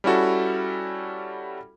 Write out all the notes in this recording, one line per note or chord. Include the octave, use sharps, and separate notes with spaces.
G3 C#4 E4 F#4 A4